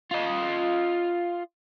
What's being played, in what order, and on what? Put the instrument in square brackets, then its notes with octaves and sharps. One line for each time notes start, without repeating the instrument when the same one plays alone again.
[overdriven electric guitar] F4 D#5